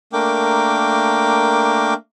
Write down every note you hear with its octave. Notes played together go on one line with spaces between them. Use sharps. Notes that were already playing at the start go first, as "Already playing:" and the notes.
A3 A#3 D4 A#4 G5 D6